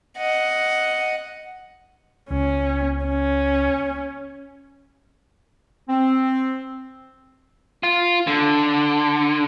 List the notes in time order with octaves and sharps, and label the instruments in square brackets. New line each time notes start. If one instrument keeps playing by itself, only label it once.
[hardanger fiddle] D#5 F#5
[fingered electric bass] C#2 [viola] C#4
[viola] C#4
[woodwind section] C4
[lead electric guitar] F4
D3